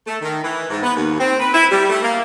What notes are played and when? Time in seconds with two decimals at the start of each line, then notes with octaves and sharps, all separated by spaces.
0.07 A3
0.22 D#3
0.43 E3
0.70 G#2
0.83 B3
0.95 D#2
1.20 C4
1.40 B4
1.54 E4
1.71 G3
1.90 A3
2.03 A#3